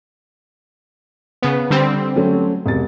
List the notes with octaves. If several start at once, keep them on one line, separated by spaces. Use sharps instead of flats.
C#3 B3
D3 G3 C4
F#3 A3 C#4
E1 C3 A6